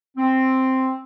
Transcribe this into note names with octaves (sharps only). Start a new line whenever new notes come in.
C4